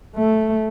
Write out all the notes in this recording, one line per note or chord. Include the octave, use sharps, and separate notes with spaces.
A3